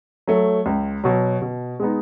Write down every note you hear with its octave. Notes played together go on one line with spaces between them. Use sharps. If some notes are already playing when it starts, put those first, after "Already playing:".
F#3 A3
C#2
B2 F#3
B2
G#3 B3 D#4